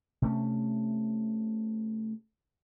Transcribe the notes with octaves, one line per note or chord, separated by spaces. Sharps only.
C3 A3 C#4